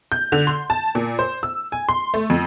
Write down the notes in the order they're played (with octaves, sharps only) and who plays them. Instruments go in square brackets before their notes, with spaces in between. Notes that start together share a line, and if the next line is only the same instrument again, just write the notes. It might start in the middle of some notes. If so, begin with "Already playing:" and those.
[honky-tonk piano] G6
D3
C6
A5
A#2
C5
E6
G#5
C6
A3
F2